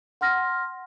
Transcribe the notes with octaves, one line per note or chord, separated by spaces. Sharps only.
F#5 C6 F6 A#6